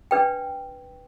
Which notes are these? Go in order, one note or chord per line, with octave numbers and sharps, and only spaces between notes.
D4 B4 G5